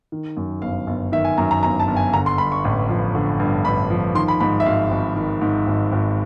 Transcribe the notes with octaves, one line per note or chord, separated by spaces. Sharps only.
D#3
F#2
G1 F5
G1
D#3 E5
G#5
F#2 A#5
A#5
G1 A#5
A5
G1
G#5
D3 A#5
C6
G2 B5
C#6
A1
F3
D3
G2
A1 B5
F3
D#3 C6
B5
G#2 B5
E5
G#1 F5
G#1
D#3
G#2
G#1
G#1